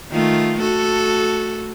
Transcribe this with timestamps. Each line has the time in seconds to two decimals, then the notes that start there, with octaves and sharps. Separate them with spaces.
0.11 D#3 A3 F4
0.60 A3 F#4 A4